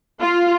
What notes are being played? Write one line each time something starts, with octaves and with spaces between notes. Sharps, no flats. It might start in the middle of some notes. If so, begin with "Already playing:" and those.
F4